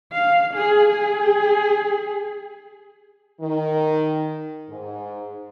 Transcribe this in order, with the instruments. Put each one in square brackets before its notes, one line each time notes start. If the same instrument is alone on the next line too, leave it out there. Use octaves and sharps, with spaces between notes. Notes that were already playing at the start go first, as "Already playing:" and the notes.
[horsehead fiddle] F5
G#4
G#4
[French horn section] D#3
G#2